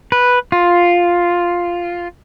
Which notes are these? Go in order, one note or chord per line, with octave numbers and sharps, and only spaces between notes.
B4
F4